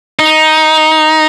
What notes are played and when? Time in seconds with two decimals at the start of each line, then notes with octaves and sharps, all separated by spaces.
0.19 D#4